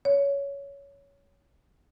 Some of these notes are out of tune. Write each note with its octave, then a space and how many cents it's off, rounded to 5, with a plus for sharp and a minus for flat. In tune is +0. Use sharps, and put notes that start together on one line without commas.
C#5 +15